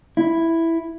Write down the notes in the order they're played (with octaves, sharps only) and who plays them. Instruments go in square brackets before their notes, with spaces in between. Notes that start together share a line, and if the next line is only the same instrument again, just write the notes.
[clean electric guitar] E4